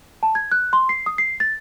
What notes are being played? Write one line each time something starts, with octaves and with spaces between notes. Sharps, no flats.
A5
G#6
F#6
C6
C7
D#6
C7
A6